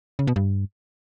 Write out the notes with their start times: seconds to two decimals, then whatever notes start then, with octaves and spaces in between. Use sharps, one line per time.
0.19 C#3
0.27 B2
0.36 G2